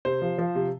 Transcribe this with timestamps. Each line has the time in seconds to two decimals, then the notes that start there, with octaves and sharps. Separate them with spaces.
0.05 C3 C5
0.22 F3
0.38 F3
0.55 C3